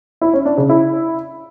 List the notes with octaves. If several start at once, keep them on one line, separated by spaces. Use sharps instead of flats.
E4
C#4
D4
C#3
E4